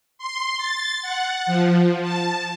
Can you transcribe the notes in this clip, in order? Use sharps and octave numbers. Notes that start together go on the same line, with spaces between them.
C6
A6
F#5
F3
A5